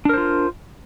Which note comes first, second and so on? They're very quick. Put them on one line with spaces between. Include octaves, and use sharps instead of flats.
D4 A#4 C5 F4